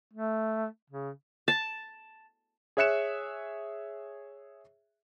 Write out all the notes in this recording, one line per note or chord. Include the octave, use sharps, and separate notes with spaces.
A3
C#3
A5
G#4 C#5 E5 F#6 C#7 E7